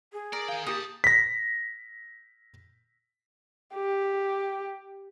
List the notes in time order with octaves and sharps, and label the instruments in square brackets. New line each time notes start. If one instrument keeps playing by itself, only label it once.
[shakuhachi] G#4
[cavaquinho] A#4 [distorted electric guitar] D5
[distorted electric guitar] D#3 G5 [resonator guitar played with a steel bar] F5
[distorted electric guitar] C3 A5 [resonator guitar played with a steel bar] A#3 G4 [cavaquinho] D#6
[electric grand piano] A#6 B6
[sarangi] G4